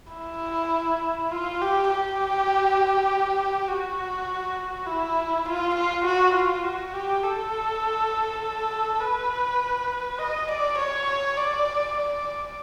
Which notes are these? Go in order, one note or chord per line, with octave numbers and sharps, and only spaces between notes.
E4
F4
G4
G4
F#4
E4
F4
F4
F#4
F4
F#4
G4
A4
B4
D#5
D5
C#5
D5
D5